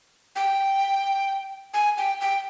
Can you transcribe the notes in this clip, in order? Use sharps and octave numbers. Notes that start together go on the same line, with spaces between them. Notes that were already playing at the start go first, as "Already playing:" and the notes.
G5
G#5
G5
G5